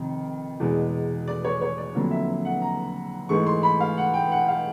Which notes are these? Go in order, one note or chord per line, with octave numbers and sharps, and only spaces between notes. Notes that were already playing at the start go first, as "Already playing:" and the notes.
Already playing: F1 F2 C3 D#3
E2 B2 G#3
D5
C#5
C#5
D5
F2 D3 F#3 A#3
E5
F#5
A#5
G#2 E3 A3 C#6
C6
B5
F5
F#5
G5
F#5
F5